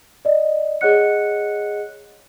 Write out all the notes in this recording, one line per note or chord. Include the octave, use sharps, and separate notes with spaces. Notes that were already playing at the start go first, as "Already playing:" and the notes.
D5 D#5
G#4 C#5 D#5 F#5 F#6 C#7